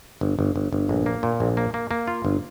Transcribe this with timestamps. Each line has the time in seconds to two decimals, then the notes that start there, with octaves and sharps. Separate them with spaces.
0.21 G1
0.39 G1
0.56 G1
0.73 G1
0.89 A#1
1.06 A#3
1.23 A#2
1.40 A#1
1.57 A#3
1.74 A#3
1.91 A#3
2.08 F4
2.25 G1